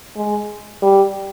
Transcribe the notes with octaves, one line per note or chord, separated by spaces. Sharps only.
G#3
G3